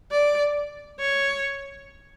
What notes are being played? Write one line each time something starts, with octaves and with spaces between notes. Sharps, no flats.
D5
C#5